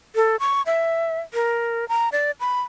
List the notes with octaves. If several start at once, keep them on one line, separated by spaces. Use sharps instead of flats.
A4
C#6
E5
A#4
A#5
D5
B5